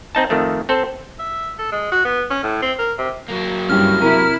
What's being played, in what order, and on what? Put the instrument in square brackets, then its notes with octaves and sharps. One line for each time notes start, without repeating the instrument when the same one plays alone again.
[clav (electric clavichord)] C4 D#4 A5
F2 D#3 A3
C4 A4 C5
[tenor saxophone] E5
A4
G#3
F#4
B3
C#4
A2
C4
A#4
C3
[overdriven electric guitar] F#3 A#3
[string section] G2 [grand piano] C#4 E4 G4 [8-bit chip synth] F6
[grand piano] C3 A#4 D#7 [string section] E4